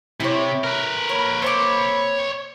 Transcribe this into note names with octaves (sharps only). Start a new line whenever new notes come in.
C3 E4 C#5
A#4 B4
A#3 C#5 B5
C4 C#5 A5 C6 D6